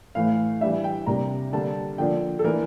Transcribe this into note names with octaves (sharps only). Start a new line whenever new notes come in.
A2 E3 A3 F5
E3 G3 D4 E5
G5
C3 G3 A#3 D4 A#5
D3 G3 A#3 D4 A5
D3 F3 A#3 D4 G5
A4
E3 A#3 D4 A#4